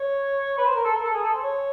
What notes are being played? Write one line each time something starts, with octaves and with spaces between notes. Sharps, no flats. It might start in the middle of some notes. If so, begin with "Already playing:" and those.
Already playing: C#5
B4
C5
A#4
A4
A#4
A4
G#4
A4
C5
C#5